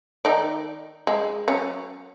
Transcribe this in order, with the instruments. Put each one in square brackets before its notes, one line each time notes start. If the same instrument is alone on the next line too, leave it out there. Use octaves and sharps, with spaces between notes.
[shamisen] D#3 D#4 D5
G#3
F#3 C#4